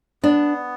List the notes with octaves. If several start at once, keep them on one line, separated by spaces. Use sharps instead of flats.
B3 D4